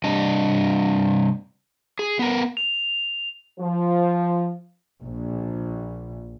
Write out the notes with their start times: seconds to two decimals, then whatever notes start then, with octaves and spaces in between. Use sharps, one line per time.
0.04 C3 G3 D4 D#5
1.99 G#4
2.19 B3 A#4
2.57 F7
3.59 F3
5.02 A#1